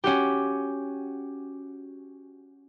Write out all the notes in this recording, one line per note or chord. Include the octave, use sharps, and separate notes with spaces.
C#4 F#4 G4